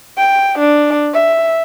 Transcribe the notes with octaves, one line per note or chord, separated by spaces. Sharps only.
G5
D4
E5